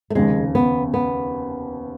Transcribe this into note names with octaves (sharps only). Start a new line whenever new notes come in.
A3
F1 D#2 C#3 G#3
B3
B3